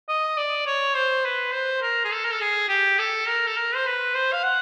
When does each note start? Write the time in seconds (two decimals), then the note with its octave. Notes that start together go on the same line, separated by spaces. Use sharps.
0.08 D#5
0.37 D5
0.67 C#5
0.95 C5
1.25 B4
1.53 C5
1.82 A#4
2.05 G#4
2.12 A4
2.25 A#4
2.32 A4
2.41 G#4
2.69 G4
2.99 A4
3.28 A#4
3.47 A4
3.57 A#4
3.75 C5
3.86 B4
4.15 C5
4.33 F5
4.43 F#5